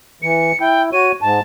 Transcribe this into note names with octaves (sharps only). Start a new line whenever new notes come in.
E3 C#7
E4 G5
F#4 C#5 D#7
G#2 A5